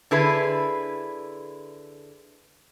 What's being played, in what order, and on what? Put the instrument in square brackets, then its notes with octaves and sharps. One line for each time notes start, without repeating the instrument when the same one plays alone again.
[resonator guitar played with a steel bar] D3 E4 G#4 B4